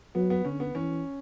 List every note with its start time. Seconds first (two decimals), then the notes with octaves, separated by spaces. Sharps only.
0.15 F#3 B3
0.30 B3
0.45 D3 C#4
0.60 B3
0.75 E3 C#4